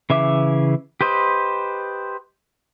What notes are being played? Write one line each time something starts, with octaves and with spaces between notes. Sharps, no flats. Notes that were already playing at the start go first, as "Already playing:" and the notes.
C#3 E3 E5 D6
G4 B4 C5 D#5